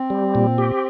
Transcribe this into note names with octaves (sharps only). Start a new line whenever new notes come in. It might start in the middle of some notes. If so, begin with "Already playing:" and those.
Already playing: C4
G3
A#2
G4